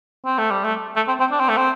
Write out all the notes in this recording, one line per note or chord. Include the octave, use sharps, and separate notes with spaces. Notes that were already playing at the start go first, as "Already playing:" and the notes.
C4
A3
G3
A3
A3
C4
C4
D4
C4
A3
C4